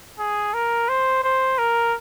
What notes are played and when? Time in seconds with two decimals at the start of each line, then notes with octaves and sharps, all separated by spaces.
0.19 G#4
0.54 A#4
0.89 C5
1.23 C5
1.58 A#4